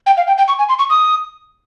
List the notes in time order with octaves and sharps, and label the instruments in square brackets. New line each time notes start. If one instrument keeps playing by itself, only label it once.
[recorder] G5
F5
G5
G5
C#6
G#5
C6
C#6
D#6